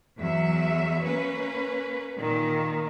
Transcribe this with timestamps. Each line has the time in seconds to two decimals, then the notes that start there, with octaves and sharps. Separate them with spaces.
0.19 E2 F#3 E5
1.04 A#3 C#4 B4
2.18 A#2 D#3